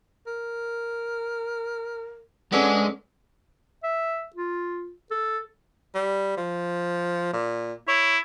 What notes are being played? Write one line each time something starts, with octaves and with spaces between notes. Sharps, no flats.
A#4
G#3 C#4 D4 G#4 A4 B4 F#5
E5
F4
A4
G3
F3
A#2
E4 C#5